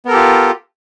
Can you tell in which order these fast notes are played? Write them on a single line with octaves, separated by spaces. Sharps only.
B3 A#4 A4 G4 F4